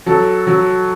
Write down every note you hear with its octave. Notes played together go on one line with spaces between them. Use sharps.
F#3 A4
F#3